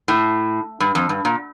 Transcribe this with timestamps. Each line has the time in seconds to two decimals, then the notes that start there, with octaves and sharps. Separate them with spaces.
0.08 A2
0.80 G2
0.95 F2
1.09 G2
1.25 A#2